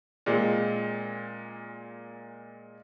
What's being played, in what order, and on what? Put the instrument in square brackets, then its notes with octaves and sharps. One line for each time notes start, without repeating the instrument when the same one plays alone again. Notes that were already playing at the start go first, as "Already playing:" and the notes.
[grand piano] A#2 G#3 C4